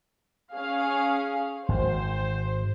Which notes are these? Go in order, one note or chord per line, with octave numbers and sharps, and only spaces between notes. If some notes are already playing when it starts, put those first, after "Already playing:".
C#4 G#4 F5
G#1 C5